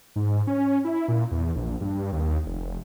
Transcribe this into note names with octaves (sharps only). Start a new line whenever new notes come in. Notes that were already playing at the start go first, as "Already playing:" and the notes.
G#2
C#4
E4
A#2
E2
A#1
G2
D#2
F1